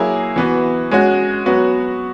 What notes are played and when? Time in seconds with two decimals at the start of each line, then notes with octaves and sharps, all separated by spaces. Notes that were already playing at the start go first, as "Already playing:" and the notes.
Already playing: F#3 A#3 E4 G#4
0.36 E3 B3 F#4
0.91 G#3 C#4 F#4
1.46 F#3 B3 F#4